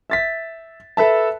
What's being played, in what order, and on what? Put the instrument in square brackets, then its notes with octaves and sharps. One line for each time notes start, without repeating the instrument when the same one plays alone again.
[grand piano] E5 A6 B6
A4 B4 E5 A5